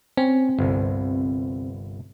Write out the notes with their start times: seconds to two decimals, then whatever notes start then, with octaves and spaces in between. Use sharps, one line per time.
0.17 C4 C#4
0.59 G1 C2